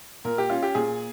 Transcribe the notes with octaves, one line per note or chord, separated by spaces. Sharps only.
A#2 A#4
G4
C#4 F4
G4
A#2 G#4